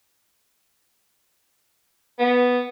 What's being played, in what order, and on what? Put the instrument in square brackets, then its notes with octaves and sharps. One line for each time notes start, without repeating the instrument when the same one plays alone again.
[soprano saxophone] B3